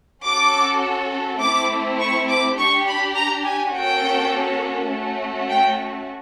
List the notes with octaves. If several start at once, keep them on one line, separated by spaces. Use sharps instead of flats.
C#4 F#4 A4 D6
A3 C4 E4 D6
C#6
D6
D4 G4 C#6
B5
A#5
G#5
A#3 C#4 F#4 A4 G5
A3 C#4 F#4
G5